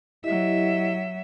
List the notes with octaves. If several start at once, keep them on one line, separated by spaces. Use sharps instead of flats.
F#3 E4 G4 D#5 E5